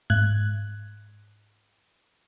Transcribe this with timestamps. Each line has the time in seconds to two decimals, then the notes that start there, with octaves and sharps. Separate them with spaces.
0.10 G#2 F#6 G#6